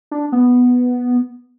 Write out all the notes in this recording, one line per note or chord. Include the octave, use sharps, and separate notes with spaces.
D4
B3